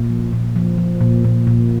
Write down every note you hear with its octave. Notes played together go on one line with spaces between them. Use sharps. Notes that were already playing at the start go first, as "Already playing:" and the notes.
Already playing: A#2
F3
A#2
F3
F3
A#2
A#2
A#2